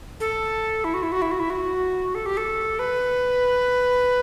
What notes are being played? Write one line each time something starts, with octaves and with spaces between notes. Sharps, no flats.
A4
E4
F#4
E4
F#4
E4
F#4
E4
F#4
A4
G4
A4
B4